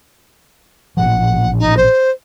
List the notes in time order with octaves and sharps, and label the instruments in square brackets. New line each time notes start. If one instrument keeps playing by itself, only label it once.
[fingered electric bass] A1 A#2 F3 [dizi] F#5
[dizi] D#4
C5